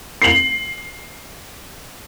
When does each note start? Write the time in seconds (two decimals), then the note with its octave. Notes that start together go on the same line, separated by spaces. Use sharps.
0.22 C7 F#7